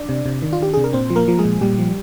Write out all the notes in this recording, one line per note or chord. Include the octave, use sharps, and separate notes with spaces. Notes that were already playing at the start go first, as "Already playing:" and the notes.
Already playing: D4 D5
C3
C3
D#3
F4
D#3 G4
C3 G#4
A#4
A#2 C4 C5
F3
A#3 A#4
F3
G#3 G#4
A#2
A#2 G3 G4
F3